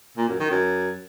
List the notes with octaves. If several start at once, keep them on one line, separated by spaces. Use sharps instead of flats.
A#2
F#2
D#3
F#2